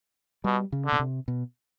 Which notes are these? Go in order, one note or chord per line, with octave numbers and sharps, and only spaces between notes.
B2 G3
C#3
D3
B2
C3
B2